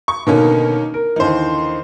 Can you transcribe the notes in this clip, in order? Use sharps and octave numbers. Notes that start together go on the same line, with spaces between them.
C#6
B2 D3 D#3 A#3 C#4 D#4
A#4
D#2 D3 E3 D#4 C5